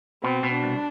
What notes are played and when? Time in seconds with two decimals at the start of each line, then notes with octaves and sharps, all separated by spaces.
0.23 B2 C4
0.43 B2
0.52 D4
0.62 C2